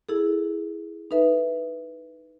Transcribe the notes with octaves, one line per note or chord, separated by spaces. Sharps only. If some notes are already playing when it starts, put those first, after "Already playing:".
E4 G#4 A4
D#4 A4 B4 E5